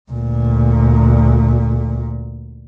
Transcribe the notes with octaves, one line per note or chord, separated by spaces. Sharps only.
D2 A#2